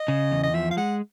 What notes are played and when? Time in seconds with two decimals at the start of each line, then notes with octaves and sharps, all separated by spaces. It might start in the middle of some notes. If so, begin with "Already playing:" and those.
Already playing: D#5
0.08 C#3
0.31 E2
0.43 D#5
0.54 F3 E5
0.71 F5
0.77 G#3 F#5